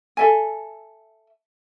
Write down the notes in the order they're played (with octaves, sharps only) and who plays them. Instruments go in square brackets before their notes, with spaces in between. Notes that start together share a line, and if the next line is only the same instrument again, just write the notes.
[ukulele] A4 E5 G#5